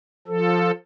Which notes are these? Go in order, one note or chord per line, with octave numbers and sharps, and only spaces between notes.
F3 A4